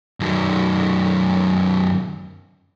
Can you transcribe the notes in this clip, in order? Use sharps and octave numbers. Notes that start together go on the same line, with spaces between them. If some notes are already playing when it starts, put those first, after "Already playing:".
F#2 D#3